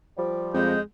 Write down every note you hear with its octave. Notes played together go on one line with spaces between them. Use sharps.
F3 G3
F2 G#3 D#5 G6